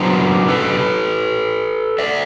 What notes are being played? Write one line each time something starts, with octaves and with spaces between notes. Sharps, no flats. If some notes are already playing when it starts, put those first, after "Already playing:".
Already playing: C#3 F#3 B3 D4 A#4 C5
A4 B4
D5 E5